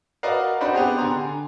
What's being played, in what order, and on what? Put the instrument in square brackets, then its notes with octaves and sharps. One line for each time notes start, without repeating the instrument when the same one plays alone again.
[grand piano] F#4 A#4 B4 D5 D#5 F5
C4 D4 D#4 F#4 B5 C6
B3 G4 G#4
D3 G#5 A#5 C6